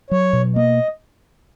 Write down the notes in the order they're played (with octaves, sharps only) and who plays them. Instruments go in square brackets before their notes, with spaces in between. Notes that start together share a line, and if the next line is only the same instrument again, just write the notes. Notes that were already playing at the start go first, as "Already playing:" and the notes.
[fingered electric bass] F#3 [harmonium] C#5
[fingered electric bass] B2
[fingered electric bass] A#3 [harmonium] D#5